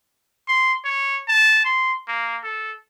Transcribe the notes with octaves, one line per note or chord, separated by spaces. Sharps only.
C6
C#5
A5
C6
A#3
A4